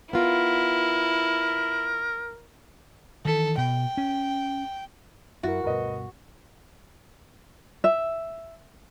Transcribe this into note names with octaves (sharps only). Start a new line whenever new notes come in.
B3 E4 F4 A#4
D#3 E3 A4
B2 G5
C#4
F#2 E4 F#4 A#4
D2 G2 B2 A#4 B4 D#5
E5